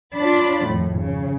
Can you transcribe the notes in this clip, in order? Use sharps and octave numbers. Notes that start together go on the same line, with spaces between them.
D4 F4 C#5 B5 A6
G#1 F2 A2
C#3